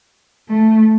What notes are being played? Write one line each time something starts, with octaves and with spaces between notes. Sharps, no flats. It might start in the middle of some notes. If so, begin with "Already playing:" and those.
A3